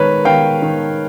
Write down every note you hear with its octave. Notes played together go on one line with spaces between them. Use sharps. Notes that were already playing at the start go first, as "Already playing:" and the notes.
Already playing: D#3 G#3 A#4 B4 C#5
D#3 F5 G5
D#3